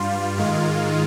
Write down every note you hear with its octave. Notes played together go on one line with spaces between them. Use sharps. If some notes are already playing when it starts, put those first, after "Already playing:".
Already playing: G2 G3 F4
G#2 D#3 G#3